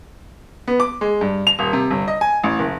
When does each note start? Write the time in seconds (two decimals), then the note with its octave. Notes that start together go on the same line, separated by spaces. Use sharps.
0.68 B3
0.80 D6
1.01 G#3
1.21 G2
1.47 F7
1.59 D#1
1.73 C3
1.91 G1
2.08 D#5
2.21 G#5
2.43 A1
2.59 F#1